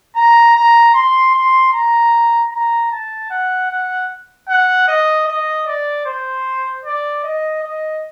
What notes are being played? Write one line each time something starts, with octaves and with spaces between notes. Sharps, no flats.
A#5
A#5
C6
C6
A#5
A#5
A5
F#5
F#5
F#5
D#5
D#5
D5
C5
D5
D#5
D#5